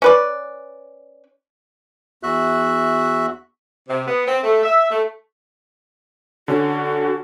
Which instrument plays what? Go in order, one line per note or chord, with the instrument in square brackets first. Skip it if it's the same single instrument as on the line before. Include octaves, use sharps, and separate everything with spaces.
[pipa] C#4 B4 D5
[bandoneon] E2 F#4 E5 F#6
[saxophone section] C3
B3
C4
A3
E5
A3
[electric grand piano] D3 C#4 [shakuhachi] F#4